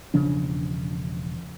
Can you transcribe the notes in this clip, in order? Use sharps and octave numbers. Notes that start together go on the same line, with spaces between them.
E1 C#3 F3 D4